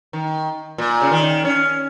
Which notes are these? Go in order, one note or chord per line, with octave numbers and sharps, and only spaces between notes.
D#3
A#2
C#3
D#3
C#4